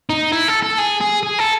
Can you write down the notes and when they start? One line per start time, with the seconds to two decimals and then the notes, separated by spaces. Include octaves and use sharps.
0.10 D#4
0.32 E4
0.48 A4
0.63 A4
0.78 G#4
1.01 G#4
1.23 G#4
1.39 A4